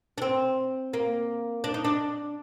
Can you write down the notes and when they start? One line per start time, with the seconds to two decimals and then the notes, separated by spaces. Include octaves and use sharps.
0.18 D4
0.22 C4
0.93 A#3
1.64 D4
1.74 D#4
1.85 D4